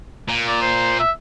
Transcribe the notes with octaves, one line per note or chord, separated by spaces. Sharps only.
A#2
D5
C5
E5